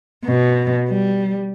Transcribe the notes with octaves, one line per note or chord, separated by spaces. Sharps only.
B2
G3